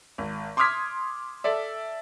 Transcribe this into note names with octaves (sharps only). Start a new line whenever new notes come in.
G#1
C6 D6 D#6 F6 G#6 B6
A4 D5 E5